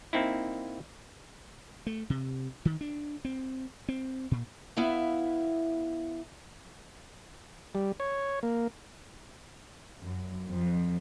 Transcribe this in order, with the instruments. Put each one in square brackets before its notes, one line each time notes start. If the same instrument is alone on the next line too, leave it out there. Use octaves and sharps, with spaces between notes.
[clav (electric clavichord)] A#3 C4 D#4 E4
[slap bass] A3
C3
D#3
D4
C4
C4
A#2
[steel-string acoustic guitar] B3 E4 E5 F5
[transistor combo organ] G3
C#5
A#3
[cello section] F#2
F2